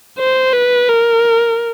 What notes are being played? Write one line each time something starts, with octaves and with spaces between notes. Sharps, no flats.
C5
B4
A#4